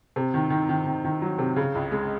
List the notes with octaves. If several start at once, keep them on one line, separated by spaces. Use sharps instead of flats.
C3
D#3
D#3
D#3
D#3
D#3
F#3
C3
C#3
C#2
G#3